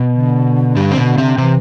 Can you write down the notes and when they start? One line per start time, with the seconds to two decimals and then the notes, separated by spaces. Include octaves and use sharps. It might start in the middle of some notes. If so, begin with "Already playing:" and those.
Already playing: B2
0.14 D3
0.76 G2 G3
0.91 C4
0.97 B2 B3
1.18 C3 C4
1.38 C3 E3 C4